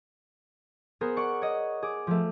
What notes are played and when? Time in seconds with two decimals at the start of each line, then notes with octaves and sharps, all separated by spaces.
1.01 B3 G#4 A#4 C5
1.17 D5 F#5 C#6
1.42 C#5 D#5
1.82 G#4 D6
2.07 F3 A3